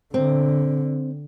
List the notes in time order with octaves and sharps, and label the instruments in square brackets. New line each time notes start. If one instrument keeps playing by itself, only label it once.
[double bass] D3 [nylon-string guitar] C4